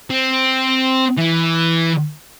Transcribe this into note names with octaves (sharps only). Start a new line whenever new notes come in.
C4
E3